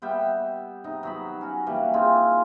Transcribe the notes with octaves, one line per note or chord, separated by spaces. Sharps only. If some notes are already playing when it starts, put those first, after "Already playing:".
G3 B3 E5 G5
C3 D#4
F#3 B3 B5
C#4 F#4
E3 G3 A#3 B4
C4 D#4 F4 G#4